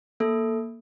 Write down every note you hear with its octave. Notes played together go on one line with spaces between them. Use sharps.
A#3 A4